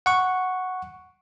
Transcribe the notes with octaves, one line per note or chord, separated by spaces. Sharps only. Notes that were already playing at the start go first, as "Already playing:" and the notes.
F#5 C#6